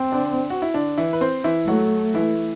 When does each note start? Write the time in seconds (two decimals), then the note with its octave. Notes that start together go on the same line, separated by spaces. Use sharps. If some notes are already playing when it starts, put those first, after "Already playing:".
Already playing: C4
0.12 D3 D4
0.50 F#4
0.62 E4
0.74 D3 D4
0.98 E3 E4
1.13 B4
1.21 C4 C5
1.44 E3 E4
1.67 F#3 A3 F#4
2.14 E3 E4